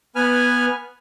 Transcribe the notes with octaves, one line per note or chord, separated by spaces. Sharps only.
B3 B4 G#5 F6